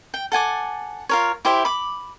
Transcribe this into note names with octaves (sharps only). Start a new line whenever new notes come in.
G5
A4 F#5 G#5 D6
F4 A#4 C#5
E4 G4 C5 E5
B5 D6